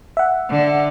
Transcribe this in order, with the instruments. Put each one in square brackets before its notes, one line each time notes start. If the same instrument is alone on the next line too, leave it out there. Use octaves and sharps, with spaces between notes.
[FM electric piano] E5 F#5
[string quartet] D3